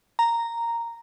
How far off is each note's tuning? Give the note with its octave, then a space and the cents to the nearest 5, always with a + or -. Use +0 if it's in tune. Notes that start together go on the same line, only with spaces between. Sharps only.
A#5 -5